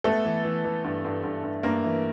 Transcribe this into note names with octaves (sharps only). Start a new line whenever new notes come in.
A3 B3 A4
E3
E3
E3
G2
G2
G2
G2
G2 A#3 A#4
E3